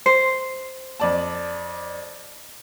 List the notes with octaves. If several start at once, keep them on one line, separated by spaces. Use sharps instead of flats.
C5
F2 D5 A5